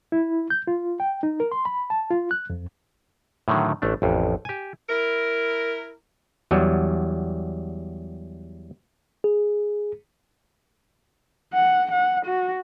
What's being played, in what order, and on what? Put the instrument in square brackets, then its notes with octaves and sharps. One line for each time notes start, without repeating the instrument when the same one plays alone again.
[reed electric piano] E4
G6
F4
G5
D#4
A#4
C6
B5
A5
F4
F#6
F2
[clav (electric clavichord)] A2 D3 D#3 F#3
A1 A3 D4
A1 F2
G4 G#5
[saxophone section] E4 A#4
[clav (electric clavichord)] E2 F#3 G3
[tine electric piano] G#4
[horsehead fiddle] F#5
F#5
F#4